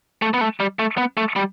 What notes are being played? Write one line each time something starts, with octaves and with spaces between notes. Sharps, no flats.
A3
B3
A3
G3
A3
B3
A3
G3